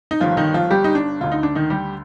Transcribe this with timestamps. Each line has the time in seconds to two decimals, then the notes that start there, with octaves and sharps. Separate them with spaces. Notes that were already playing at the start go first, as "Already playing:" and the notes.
0.11 D#4
0.20 G1 G2 D#3 F3 F4
0.37 D#3 D#4
0.54 F3 F4
0.71 G3 G4
0.84 D#4
0.95 D4
1.21 D2 D3 F4
1.32 D#4
1.43 D4
1.55 D#3 D#4
1.70 G3 G4